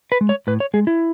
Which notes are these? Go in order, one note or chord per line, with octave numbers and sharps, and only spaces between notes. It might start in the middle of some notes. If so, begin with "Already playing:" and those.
B4
G#3
C#5
A2 B4
C#5
G#3 G#4
E4